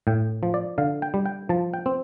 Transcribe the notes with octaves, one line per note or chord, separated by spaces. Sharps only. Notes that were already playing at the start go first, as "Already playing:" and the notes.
A2 G5
F3
D5
D3 F5
G5
G3
G5
F3 A5
G5
C4